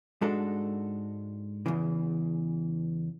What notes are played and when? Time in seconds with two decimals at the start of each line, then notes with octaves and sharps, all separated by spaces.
0.21 G#2 G#3 D4 F#4 A4
1.66 E2 C#3 E3